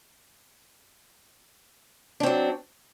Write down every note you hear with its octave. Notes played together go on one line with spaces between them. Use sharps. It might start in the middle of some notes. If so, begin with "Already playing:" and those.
F#3 C4 D4